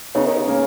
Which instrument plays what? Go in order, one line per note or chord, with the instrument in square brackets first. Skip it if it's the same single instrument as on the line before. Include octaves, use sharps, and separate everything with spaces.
[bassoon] C#3 [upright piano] B3 D#4
[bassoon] D#3
C#3
[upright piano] A#3 C#4